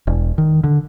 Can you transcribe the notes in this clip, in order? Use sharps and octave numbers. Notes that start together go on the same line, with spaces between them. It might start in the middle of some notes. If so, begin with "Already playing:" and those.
E1
D#3
D3